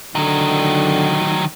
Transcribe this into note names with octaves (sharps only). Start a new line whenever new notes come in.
D3 D#3 F#3